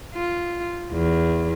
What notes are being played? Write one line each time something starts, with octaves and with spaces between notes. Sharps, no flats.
F4
E2